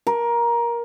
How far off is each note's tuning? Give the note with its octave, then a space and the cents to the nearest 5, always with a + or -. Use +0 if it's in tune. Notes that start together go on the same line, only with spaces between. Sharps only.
A#4 +15